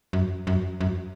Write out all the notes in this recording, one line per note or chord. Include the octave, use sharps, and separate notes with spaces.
F#2
F#2
F#2